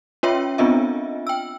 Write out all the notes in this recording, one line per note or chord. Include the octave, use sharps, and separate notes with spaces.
C#4 F4 C#5 E5 G5
B3 C4 D4 F4 D#5 E5
G5 E6